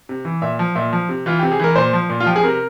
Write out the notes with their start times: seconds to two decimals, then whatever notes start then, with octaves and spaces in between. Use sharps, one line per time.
0.09 C3
0.25 E3
0.42 A#2 E5
0.59 F3
0.75 A#2 E5
0.93 F3
1.09 C3
1.26 E3 F4
1.39 C3 G4
1.52 G#4
1.59 E3 A#4
1.76 A#2 C5
1.93 F3
2.09 A#2
2.20 F4
2.26 F3 G4
2.36 G#4
2.43 C3 A#4